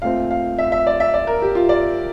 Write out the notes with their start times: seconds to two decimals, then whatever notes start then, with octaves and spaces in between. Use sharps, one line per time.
0.02 A#2 A3 C4 F5
0.31 F5
0.59 E5
0.72 E5
0.87 D5
1.00 E5
1.14 D5
1.27 A#4
1.42 G4
1.55 F4
1.69 D5